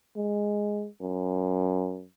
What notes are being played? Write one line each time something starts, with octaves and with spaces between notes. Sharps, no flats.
G#3
F#2